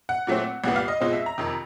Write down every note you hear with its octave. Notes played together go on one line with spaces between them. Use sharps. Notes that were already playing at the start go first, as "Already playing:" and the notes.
F#5
A#2 F#3 A3 C4
C2 A#2 G3 B3 F#5
F5
D#5
B2 G#3 C4 F4 D#5
E5
A#5
F2 C3 D#3